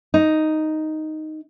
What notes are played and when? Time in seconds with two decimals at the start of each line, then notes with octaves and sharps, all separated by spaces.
0.14 D#4